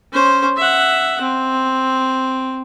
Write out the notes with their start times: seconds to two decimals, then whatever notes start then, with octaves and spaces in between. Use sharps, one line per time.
0.12 C#4 C5
0.57 E5 F#5
1.21 C4